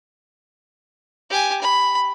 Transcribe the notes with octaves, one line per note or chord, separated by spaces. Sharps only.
G4 G#5
B5